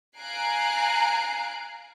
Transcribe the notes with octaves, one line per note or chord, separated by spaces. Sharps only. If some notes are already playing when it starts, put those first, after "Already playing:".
F5 G#5 A#5 F#6 C7 D7